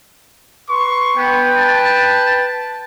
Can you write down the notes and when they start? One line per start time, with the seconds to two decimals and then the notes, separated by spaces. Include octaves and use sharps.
0.68 B4 C6 C#6
1.17 B3 B4 G5
1.57 A5